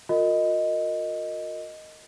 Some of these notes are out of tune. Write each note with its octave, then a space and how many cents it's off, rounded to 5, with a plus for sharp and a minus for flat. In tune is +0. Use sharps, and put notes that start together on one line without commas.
F4 +45 A#4 -25 D#5 +0